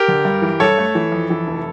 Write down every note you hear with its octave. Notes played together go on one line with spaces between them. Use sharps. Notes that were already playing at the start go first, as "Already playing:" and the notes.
Already playing: G4 A#4
D3
G2
E3
G2 A4 C#5
A3
E3
F2
E3
F1